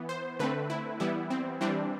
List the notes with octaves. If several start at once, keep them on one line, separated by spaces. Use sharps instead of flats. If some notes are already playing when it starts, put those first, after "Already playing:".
Already playing: E3 B3
C5
D3 A3 C4 B4
E4
E3 G3 B3 E4
C4
E3 G3 C4 D4